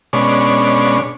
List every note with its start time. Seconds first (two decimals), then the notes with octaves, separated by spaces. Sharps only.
0.13 B2 G#3 C#4 D4